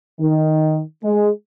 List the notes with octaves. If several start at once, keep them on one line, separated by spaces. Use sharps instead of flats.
D#3
G#3